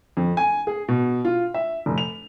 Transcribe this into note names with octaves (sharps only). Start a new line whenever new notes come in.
F2
G#5
G#4
B2
F4
E5
F1
F7